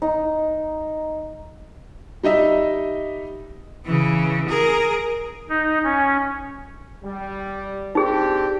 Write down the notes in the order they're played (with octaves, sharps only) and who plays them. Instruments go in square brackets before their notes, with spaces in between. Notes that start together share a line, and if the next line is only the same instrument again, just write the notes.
[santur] D#4
[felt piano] G3 D#4 D#5 E5
[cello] C#3 E3
G#4 A#4
[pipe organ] D#4
C#4
[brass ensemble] G3
[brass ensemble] C4 D4 G4 [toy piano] D#4 G#4